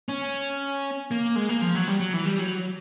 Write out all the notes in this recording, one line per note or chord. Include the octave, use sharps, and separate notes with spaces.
C#4
A#3
G#3
A#3
F3
F#3
G3
F#3
E3
G3
F#3